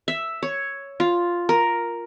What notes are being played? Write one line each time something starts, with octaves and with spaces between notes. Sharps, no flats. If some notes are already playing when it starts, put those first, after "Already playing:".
E5
C#5
F4
A#4